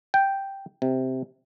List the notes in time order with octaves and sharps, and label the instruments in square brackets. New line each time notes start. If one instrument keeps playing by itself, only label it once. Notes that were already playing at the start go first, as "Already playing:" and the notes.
[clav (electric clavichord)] G5
C3